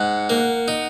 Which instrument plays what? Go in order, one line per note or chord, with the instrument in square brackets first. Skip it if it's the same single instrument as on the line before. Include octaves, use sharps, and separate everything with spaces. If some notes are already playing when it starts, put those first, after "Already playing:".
Already playing: [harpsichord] G#2 [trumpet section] F#5
[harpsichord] A#3 [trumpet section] F#5
[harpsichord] D#4